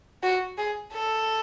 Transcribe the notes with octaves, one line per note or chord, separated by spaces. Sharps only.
F#4
G#4
A4